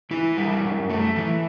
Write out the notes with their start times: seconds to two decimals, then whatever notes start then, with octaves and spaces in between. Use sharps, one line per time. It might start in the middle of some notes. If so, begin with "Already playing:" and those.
0.11 E3 E4
0.38 G3
0.64 F#2
0.90 A3
1.16 E3